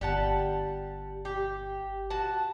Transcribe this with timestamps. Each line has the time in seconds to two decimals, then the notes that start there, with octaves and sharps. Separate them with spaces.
0.01 G1 G3 F#5 A5
1.25 G4
2.10 F#4 A5